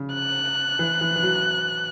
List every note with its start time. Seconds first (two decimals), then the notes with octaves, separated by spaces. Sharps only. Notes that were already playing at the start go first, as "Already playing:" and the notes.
Already playing: C#3
0.14 F#6
0.79 E3
1.01 E3
1.16 E3
1.23 F#3